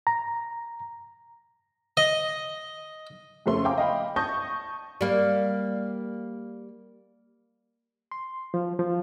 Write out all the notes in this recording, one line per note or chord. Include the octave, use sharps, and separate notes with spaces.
A#5
D#5
F2 C#3 A3 C6
F5 G5 G#5 A#5 D6
D#5 F5 G5 B5
A5 C#6 D#6 G6 A#6
G3 A#3
C6
F3
F3